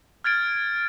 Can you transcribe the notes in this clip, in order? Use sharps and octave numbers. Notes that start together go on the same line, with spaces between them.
F6 G#6 A6 D7